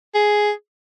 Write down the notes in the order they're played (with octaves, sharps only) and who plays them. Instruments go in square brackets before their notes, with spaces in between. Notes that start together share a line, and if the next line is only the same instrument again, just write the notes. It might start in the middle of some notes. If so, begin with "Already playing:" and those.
[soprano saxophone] G#4